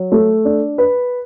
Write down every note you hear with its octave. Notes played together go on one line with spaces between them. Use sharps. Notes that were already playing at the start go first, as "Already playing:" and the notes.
Already playing: F#3
A3
D4
B4